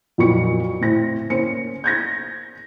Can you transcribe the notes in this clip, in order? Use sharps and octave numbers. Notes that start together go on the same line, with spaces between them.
F2 A#2 F#3 A#3 C#6 C#7
A2 C4 A#6
A#3 C#4 C5 C#7
G6 G#6 A#6